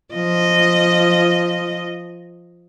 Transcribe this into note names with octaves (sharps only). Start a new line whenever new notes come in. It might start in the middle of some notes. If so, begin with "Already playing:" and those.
F3 D#5